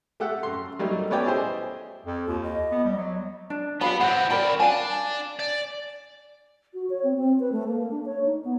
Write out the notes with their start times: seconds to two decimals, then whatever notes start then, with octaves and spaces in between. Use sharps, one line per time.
0.20 A3 G4 A4 E5 F#5
0.43 F#2 C6
0.79 F#3 G3 A3 A#3 D#4
1.10 A3 B3 C#4 C#5 D5 G5
1.26 E4 G4 G#4 C5 D#5 G#5
2.06 F2
2.27 D#2 F4
2.43 D#5
2.72 B3
2.85 G3
2.97 F#3
3.50 D4
3.81 B3 G4 F5 B5
4.01 A2 C4 F#5
4.31 C#4 A#4 D5 G5 B5
4.60 D4 F5 G#5
5.39 D5
6.74 F#4
6.90 C#5
7.03 C4
7.17 C4
7.40 B4
7.52 A3
7.68 A#3
7.91 D4
8.06 C#5
8.26 D#4
8.45 B3